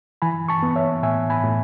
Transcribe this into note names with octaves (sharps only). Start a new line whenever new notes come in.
E3 G#5 B5
A5 C#6
B3
C#5 E5
A2 E5 G#5
G#5 B5
A2